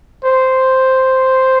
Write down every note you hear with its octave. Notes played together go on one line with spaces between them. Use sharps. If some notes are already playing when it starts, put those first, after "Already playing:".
C5